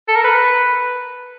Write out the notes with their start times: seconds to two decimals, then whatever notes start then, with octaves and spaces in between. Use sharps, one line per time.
0.08 A4
0.16 A#4
0.24 B4